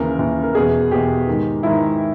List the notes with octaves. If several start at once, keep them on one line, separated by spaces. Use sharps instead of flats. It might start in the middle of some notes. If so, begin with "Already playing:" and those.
Already playing: D#2 C#3 E3 A#4
D#2 C#3 E3
A#4
E2 B2 G#4
E2 B2 G4
G#2 D#3
G#2 D#3 E4